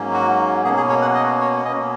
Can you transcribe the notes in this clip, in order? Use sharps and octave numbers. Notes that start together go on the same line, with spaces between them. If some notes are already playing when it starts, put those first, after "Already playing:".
Already playing: G#2 F#3 A#3 C#4
F#4
B2 A#3 C#4 G#4
G#4
C#5
F#5
D#5
C#5
B2 A#3 C#4 D#5